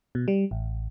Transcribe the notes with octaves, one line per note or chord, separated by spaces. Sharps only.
B2
G3
A1